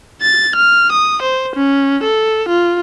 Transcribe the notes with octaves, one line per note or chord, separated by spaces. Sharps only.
A6
F6
D#6
C5
C#4
A4
F4